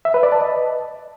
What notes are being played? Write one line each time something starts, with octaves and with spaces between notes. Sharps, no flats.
E5
B4
D5
A5
D#5